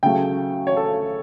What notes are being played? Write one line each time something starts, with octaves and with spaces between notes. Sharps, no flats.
C#3 F#3 A3 G5
C#5
A4